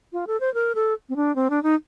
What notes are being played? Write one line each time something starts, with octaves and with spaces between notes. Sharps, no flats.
F4
A4
C5
A#4
A4
C4
D4
C4
D4
D#4